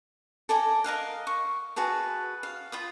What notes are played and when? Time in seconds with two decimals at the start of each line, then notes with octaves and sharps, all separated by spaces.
0.49 A4 D5 G#5 A#5
0.84 A#4 D#5 F5 F#5
1.27 C#6
1.76 F#4 G#4 B4 A5
2.43 F5
2.72 F4 B5 D#6